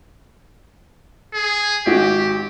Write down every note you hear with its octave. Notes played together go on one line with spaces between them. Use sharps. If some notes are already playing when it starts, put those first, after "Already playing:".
G#4
G#1 F#4 G4